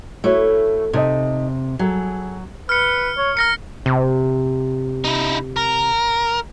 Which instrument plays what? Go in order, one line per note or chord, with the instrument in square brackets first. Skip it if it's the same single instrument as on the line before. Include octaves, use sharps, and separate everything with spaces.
[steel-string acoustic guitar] A3 [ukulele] E4 F#4 C#5
[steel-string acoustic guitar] C3 [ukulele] D#4 A4 D#5
[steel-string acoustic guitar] F#3 [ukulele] G#4 A4
[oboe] B4 [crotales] F6 C#7
[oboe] C#5
[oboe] A#4 [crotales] F6 A#6 C#7
[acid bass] C3
[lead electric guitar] D#4 E4
A#4